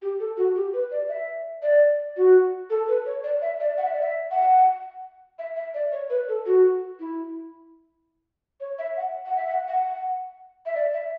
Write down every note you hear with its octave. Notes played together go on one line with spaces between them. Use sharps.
G4
A4
F#4
G4
B4
D5
E5
D5
F#4
A4
B4
C#5
D5
E5
D5
F#5
E5
D5
E5
F#5
E5
E5
D5
C#5
B4
A4
F#4
E4
C#5
E5
F#5
F#5
E5
F#5
F#5
E5
D5
E5